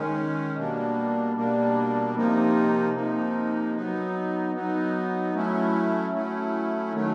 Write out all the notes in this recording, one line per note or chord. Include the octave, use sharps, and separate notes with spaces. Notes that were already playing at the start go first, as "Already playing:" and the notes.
Already playing: D#3 G#3 C#4
B2 G3 A#3 D4
B2 G3 A#3 D4
C3 F3 A#3 D#4
C3 F3 A#3 D#4
F#3 B3 D#4
F#3 B3 D#4
F#3 A3 C#4 E4
F#3 A3 C#4 E4
D#3 F#3 A3